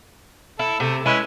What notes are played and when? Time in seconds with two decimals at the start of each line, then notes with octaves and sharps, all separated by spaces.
0.59 E4 A4
0.80 C3 A3
1.06 G#3 C#4 E4 B4